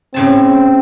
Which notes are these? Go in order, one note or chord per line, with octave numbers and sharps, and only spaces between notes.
A2 C#3 C4 A5